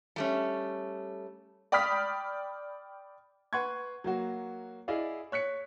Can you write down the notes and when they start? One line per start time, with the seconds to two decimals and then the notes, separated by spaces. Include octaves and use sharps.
0.16 G3 A3 C#4
1.72 D5 G5 B5 D#6 F6 B6
3.53 B4 F#5 C6 C#6 G#6
4.04 F#3 A#3 F#4
4.88 E4 G#4 D5 D#5 F5
5.32 C#5 F#6 B6 C#7